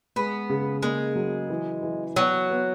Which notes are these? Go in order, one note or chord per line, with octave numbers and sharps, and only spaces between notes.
G#3 B3
C#3
G#3 A#3
F#3
E3
E3
F#3 B3
B3